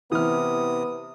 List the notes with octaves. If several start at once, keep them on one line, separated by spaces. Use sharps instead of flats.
C3 E3 B3 D#6 F6